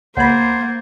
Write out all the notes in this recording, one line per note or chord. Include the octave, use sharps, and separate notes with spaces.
C#2 A#3 C5 F#5 B5 G#6 A6